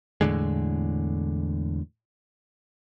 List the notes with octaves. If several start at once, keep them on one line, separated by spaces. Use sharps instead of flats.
E2 A2 D3 G#3